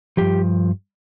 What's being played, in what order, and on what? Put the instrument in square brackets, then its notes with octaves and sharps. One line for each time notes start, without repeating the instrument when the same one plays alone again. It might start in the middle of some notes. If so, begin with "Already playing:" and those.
[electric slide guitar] G2 F3 G4